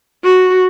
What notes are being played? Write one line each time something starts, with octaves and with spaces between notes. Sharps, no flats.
F#4